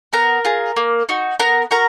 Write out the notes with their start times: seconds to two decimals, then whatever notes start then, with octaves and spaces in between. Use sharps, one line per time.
0.13 B3 A#4 A#5
0.45 F4 G#4
0.76 A#3
1.09 D#4 F#4
1.39 B3 A#4 A#5
1.71 F#4 A#4 A#5